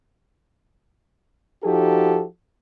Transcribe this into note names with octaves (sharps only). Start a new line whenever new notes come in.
F3 D#4 F#4 G4 A4